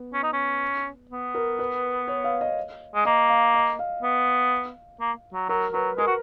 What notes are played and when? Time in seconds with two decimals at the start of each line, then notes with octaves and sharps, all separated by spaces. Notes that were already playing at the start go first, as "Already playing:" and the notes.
Already playing: B3
0.13 C#4
0.23 D#4
0.33 C#4
1.11 B3
1.35 A#4
1.59 B4
2.08 C#5
2.24 F5
2.41 D#5
2.95 G#3
3.05 A#3 D#5
3.29 F5
3.54 D#5
3.79 F5
4.02 B3
5.00 A#3
5.33 F#3
5.49 F#3 A#4
5.73 F#3 B4
5.98 G#3 A#4
6.07 F#4